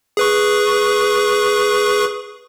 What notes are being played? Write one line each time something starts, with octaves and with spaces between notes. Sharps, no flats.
G#4 B4 C#6